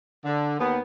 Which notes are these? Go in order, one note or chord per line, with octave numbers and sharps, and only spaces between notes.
D3
D#2 B3